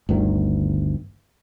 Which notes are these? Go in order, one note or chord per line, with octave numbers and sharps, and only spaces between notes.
G1 D2 D#3